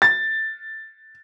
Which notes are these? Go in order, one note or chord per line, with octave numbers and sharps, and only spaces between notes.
A6